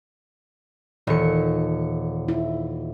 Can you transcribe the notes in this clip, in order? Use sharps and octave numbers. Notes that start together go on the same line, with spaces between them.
D#1 E3 A4 C#7
E4